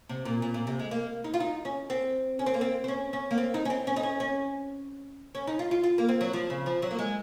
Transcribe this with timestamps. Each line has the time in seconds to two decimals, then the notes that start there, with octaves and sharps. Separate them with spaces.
0.09 C3
0.25 A#2
0.42 A#2
0.54 A#2
0.67 C3
0.79 G#3
0.91 A#3
1.24 D#4
1.34 F4
1.40 D#4
1.65 C#4
1.90 C4
2.39 C#4
2.46 C4
2.54 A#3
2.61 C4
2.84 C4
2.88 C#4
3.13 C#4
3.31 A#3
3.38 C4
3.54 D#4
3.65 C#4
3.70 C4
3.87 C#4
3.96 D#4
4.03 C#4
4.20 C#4
5.35 C#4
5.47 D#4
5.59 F4
5.71 F4
5.83 F4
5.98 A#3
6.09 C4
6.21 F#3
6.33 F3
6.50 C#3
6.66 F3
6.82 F#3
6.91 A#3
6.99 G#3